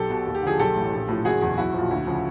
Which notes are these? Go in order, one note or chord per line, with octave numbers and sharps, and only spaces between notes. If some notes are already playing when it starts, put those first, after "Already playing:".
Already playing: B1 G4 A4
B2
D#2
G4
D3 F3 G#4
B1 G4 A4
A2 E3
A#1
A2 F3
F#1 F#4 G#4
E2 B2
B1 E4 F#4
A#2 F3
D2
C#3 F3